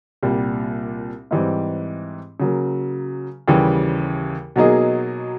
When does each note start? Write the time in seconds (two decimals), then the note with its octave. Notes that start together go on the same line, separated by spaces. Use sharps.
0.23 C2 A#2 G3
1.31 G#2 E3 G3 C4
2.40 C#3 F#3 A#3
3.48 D#2 C#3 E3 G3
4.56 B2 F#3 A#3 D#4 G#4